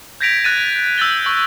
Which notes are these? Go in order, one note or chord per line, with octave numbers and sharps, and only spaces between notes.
G6 G#6 A#6 B6 D7 F7
F#6 A6 D#7
E6 G6 A6 G7
C#6